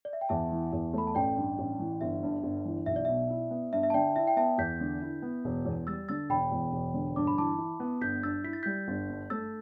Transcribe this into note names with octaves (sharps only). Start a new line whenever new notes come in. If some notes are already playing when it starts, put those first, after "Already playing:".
D5
E5
G5
E2 E5 A5
E3
E2
A3 B5
A5
A1 D5 G5
G2
A1
E3
G1 E5
G2
G1
E3
B1 E5
D5
B2 E5
E4
B3
G2 E5
E5
A5
D3 D5 G5
E4 E5
G5
B3 E5 A5
E2 G6 B6
D3
E4
B3
E1
E2
G3 E6 A6
D3 E6 A6
E1 G5 B5
E2
E1
D3
G2 D6
B5
E3 A5 D6
E4
B3
G1 G6 B6
G2 E6 A6
E4 B6
A6
G3 G6 B6
G1
G2
A3 E6 A6